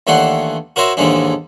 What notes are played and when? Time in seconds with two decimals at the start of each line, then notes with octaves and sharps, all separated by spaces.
0.07 D#2 E3 A3 D4 F#5 C6
0.76 F#4 A#4 C5 C#5 E5
0.97 D#2 G#2 D3 E3 D4